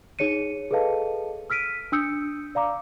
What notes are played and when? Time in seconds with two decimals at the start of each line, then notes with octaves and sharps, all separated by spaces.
0.19 D#4 G#4 C#5 C#7 D#7
0.71 G#4 A4 B4 D#5 F5 A5
1.50 E6 F6 B6 D7 D#7
1.92 D4 D#6 E6 G6 C#7
2.55 D5 F5 A#5 D6